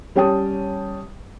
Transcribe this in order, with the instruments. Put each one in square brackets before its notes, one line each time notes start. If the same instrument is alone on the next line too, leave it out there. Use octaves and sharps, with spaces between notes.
[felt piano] G3 C#4 C#5 G5 A5 D#6